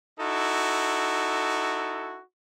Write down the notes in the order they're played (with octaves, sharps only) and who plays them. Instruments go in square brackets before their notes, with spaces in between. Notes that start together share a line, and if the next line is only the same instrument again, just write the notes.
[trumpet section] D#4 E4 F#4 A4